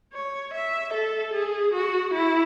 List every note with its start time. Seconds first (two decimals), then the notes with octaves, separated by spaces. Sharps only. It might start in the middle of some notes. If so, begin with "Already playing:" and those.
0.13 C#5
0.54 E5
0.94 A4
1.34 G#4
1.74 F#4
2.14 E4